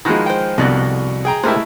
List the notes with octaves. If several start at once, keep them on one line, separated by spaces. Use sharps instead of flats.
D#3 F3 G#3 E4 F#4 A#5
C5 G5
C2 F2 B2 D3 F#4 D5 D#5
G#4 G5 A#5
B2 G#3 A3 E4 G4 A#4 C5